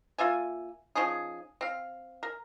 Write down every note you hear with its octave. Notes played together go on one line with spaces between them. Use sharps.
A#3 F4 E5 G#5
F3 C#4 D#4 G#4
C4 F5
A#4